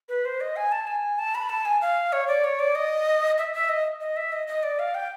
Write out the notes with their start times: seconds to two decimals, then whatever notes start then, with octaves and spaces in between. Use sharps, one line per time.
0.09 B4
0.25 C5
0.41 D#5
0.56 G#5
0.72 A5
0.87 G#5
1.18 A5
1.35 B5
1.50 A5
1.65 G#5
1.81 F5
2.13 C#5
2.28 D5
2.44 C#5
2.59 D5
2.75 D#5
3.38 E5
3.54 E5
3.69 D#5
4.00 D#5
4.16 E5
4.32 D#5
4.48 D#5
4.63 D5
4.79 F5
4.95 G5